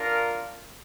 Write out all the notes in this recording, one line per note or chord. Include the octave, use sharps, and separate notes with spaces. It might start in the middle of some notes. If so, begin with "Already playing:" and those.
Already playing: D4 F4 A#4